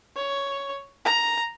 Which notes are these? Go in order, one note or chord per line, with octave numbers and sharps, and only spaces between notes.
C#5
A#5